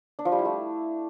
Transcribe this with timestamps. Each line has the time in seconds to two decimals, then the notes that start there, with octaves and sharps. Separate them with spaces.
0.19 D4
0.25 F3
0.32 G3
0.39 E4
0.45 A3